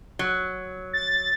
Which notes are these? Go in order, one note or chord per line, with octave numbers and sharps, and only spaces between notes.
F#3
A6